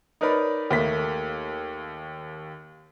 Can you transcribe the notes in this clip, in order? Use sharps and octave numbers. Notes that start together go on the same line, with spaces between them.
D#4 A#4 B4 C#5 D5 B5
D#2 A3 A#3 B6